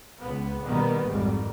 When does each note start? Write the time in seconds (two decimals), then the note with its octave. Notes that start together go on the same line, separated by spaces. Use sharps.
0.20 C#2 B3
0.66 B2 D#3 G3 A#3 B3
1.08 G#1 F2 G#2 D#3 G3